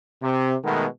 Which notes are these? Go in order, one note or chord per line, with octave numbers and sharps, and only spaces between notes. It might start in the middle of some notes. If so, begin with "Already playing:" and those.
C3
B2 D#3 G#3 A3 B3